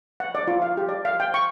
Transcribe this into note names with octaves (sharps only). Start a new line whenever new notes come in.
F#5
D5
F4
F5
G4
D5
F5
G5
C#6